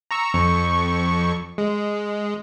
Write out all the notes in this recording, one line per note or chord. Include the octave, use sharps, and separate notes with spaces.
A#5 C#6 E6
F2 C#6
G#3